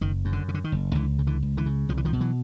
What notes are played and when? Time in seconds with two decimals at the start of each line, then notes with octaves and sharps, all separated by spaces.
0.01 F#1 D#3
0.25 F#2
0.33 D3
0.49 C#3
0.54 D3
0.64 D#3
0.72 F#1
0.95 C#2 D3 E3
1.19 C#3
1.27 D3 E3
1.43 C#2
1.57 D3 E3
1.66 C#3
1.89 C2 F3
1.97 E3
2.05 D#3 F3
2.13 B2
2.21 E3 F#3